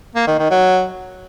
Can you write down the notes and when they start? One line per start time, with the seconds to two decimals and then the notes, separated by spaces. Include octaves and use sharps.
0.16 A#3
0.27 D#3
0.39 D#3
0.51 F#3